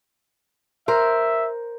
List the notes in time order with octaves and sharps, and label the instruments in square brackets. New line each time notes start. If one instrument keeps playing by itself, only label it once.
[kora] A#4 C5 [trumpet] E5